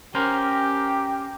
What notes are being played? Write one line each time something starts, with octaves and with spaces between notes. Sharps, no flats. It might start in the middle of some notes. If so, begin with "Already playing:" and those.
C#4 G4 A#4 C5